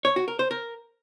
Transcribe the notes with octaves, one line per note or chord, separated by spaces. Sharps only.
C#5
F#4
A#4
C5
A#4